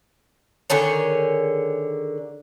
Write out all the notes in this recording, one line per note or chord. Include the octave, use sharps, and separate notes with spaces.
D3 D#3 G#4 C#5